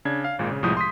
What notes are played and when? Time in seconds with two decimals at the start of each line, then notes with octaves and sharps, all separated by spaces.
0.05 C#3 D4 G#6
0.24 F5
0.39 G#1 A#2 G#3
0.51 C#3
0.63 C2 A2 F3 G#3 D#6 G6
0.77 C6 D#6 B6